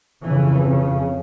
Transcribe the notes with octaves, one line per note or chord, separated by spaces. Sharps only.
F2 C#3 E3
C#3